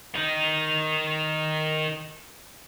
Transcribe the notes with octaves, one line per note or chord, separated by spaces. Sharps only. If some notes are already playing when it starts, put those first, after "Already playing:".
D#3 D#4